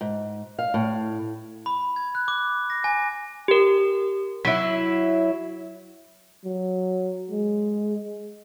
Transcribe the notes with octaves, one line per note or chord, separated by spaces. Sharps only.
G#2
F5
A2
B5
G#6
F#6
D6
A#6
G#5
G4 A#4
F#3 E4 B6
F#3
G#3